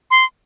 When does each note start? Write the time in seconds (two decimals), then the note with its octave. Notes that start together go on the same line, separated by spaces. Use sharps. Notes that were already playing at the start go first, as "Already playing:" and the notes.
0.11 C6